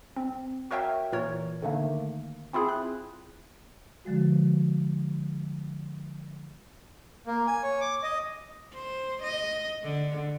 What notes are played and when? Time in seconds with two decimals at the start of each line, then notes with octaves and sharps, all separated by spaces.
0.16 C4
0.71 F#4 A#4 C#5 E5 F5 G5
1.12 A#2 E3 A#4 C#5
1.62 D3 D#3 A3 A#3
2.53 C4 E4 F4 G#4
2.69 F#6
4.05 D3 F3 G#3 F#4
7.27 A#3
7.47 G#5
7.63 C#5
7.81 D6
8.03 D#5
8.73 C5
9.23 D#5
9.83 D3